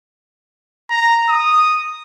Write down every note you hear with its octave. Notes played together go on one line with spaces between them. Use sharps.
A#5
D#6